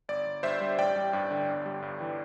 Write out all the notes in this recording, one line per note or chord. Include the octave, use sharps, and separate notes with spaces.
G1 D5
G1
G2 C5 E5
G3
A1 D5 G5
G3
G2
D3
G1
G3
G2
E3